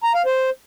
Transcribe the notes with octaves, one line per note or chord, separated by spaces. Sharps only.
A#5
F5
C5